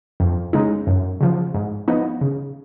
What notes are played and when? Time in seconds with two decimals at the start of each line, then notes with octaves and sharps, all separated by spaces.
0.20 F2
0.53 C#3 G#3 D#4
0.87 F#2
1.21 C#3 F3
1.54 G#2
1.88 F3 B3 D#4
2.21 C#3